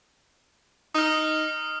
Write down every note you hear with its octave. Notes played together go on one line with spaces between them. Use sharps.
D#4 D#6 F6